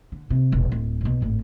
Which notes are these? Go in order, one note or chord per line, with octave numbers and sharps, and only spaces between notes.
D3
C3
E1 A#1
D1
B1 B2
G#1 A2